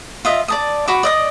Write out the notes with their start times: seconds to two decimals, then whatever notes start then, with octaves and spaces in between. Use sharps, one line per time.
0.25 F4 D#5 E5
0.48 D5 A5 D#6
0.88 F#4 B5 D6
1.03 D5 D#5 D#6